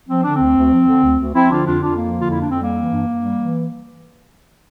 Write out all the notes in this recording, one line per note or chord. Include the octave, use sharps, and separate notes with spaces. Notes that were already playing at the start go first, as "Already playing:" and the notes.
F3 C4
D3 D4
D2 C4
D2
F3
D3
D2
D2
F3 C4 E4
D3 D4 F4
F2 D4 F4
F2 D4 F4
F3 A#3
D3 F4
F2 E4
D4
F2
C4
G3 A#3
E3
G2
G2
G3
E3